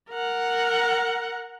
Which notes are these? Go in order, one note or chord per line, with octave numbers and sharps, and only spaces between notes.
A#4 F#5